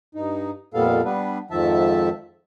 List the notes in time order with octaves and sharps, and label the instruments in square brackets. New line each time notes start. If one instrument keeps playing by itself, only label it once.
[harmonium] G2 D#4
F2 A#2 G3 B3 A4 F5
G3 B3 D4 B4
F2 G#2 D#3 F3 E5 A5